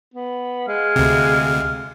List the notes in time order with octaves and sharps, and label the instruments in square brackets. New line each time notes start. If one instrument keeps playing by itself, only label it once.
[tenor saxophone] B3
[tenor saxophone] G#3 [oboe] F5
[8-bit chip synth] D2 C3